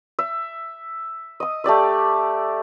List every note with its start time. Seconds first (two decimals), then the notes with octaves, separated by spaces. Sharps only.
0.19 E5
1.40 D#5 D#6
1.64 A3 G4 D5 E5